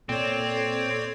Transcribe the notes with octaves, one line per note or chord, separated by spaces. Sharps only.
A#2 C4 A4 C#5 D5